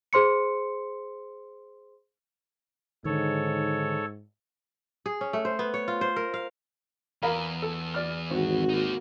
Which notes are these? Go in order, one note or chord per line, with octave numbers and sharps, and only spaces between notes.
G#4 C5 C6 C#7
G#2 D3 D#3 A4 C#5
G#4
C#4
A3
C5
B3
C#5
F4
C5
A#4
F5
E2 A#4 F5 B5
A4
D5 F6
G#1 C4 F#4
A#3 D#4